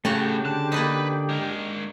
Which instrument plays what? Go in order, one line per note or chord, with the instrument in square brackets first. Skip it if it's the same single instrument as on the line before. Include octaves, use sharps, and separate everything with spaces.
[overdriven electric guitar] A2 C#4 [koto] C#3 F#4 [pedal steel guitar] A3 [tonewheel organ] G4
[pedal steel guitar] D3 F#6 [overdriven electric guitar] A5
[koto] A#3 D4 D#4 [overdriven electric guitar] B4 B5
[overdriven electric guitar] G#3 A#4